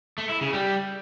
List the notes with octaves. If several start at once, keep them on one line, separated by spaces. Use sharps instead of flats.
A3
E4
C#3
G3